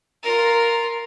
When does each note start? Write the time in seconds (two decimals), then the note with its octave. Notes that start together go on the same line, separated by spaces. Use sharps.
0.23 F4 A#4